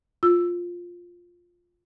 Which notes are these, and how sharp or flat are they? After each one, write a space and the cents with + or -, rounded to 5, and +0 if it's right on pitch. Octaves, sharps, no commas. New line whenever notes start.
F4 +5 E6 +10